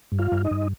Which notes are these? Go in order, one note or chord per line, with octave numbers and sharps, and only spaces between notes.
G2
F4 F5
G2
D#4 D#5
G2